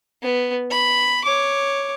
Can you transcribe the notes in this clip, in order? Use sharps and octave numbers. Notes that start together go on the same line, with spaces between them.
B3
B5
C#5 D6